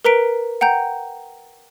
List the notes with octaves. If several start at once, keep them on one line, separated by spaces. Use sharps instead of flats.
A#4 B4 A#5 B6 D7
F#5 G5 A#5 G6